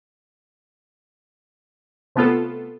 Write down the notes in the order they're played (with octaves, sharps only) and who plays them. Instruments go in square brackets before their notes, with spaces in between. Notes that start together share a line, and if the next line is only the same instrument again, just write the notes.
[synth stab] C3 A3 B3 F4 A4